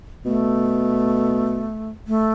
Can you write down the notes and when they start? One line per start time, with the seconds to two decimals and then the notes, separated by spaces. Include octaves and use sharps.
0.25 B2 A3
2.08 A3